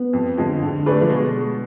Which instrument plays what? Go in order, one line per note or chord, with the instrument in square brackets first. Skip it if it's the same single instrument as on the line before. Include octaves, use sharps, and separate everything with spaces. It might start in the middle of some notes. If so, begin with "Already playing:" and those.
Already playing: [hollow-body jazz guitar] B3
[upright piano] F2
D3 F3 G#3
D3
A3 D4 G#4 B4
[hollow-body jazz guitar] F3
[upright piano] B2 [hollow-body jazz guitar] G#3